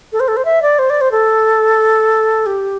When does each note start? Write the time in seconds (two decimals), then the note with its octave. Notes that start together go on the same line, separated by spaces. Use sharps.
0.13 A4
0.20 C5
0.28 A4
0.37 C5
0.45 E5
0.62 D5
0.79 C5
0.90 D5
1.01 C5
1.12 A4
2.46 G4